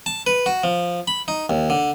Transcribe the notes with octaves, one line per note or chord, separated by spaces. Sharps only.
A5
B4
F#4
F3
B5
D#4
D#2
D3